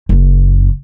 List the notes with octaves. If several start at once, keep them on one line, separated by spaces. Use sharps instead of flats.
F#1 F#2